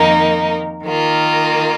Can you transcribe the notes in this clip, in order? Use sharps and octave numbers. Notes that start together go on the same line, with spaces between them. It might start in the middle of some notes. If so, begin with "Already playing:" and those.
Already playing: F2 D#3 A#3 D#4 A#4
D#3 A#3 F4